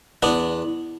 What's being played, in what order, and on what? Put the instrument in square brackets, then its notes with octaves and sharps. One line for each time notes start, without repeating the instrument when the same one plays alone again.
[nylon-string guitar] E2 [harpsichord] B3 D4